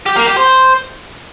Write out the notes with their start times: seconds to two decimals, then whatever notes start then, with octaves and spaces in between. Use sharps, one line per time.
0.06 G4
0.16 A#3
0.26 G4
0.37 C5